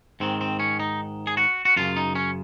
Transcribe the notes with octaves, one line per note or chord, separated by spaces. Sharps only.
G#2 D#3 C4
C4
C#4
D#4
G#4
F#4
F#4
F#2 C#3 F4
D#4
C#4